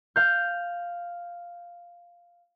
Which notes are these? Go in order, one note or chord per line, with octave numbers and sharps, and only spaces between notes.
F5 G6